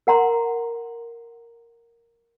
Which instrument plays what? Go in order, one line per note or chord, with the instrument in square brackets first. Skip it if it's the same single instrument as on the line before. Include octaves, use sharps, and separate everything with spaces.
[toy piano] A#4 F#5 A#5 C6